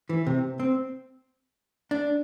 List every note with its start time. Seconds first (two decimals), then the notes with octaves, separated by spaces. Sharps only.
0.09 E3
0.27 C3
0.60 C4
1.91 D4